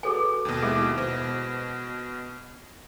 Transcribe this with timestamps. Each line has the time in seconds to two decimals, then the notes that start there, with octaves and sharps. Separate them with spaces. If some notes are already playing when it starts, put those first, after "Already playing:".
0.03 F#4 G#4 A4 B4 G#5
0.45 D#2 B2
0.62 G#3 E4 G#4 E5
0.98 B2 C5